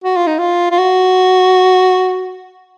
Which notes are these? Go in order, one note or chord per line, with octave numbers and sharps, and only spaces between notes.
F#4
F4
D#4
F4
F4
F#4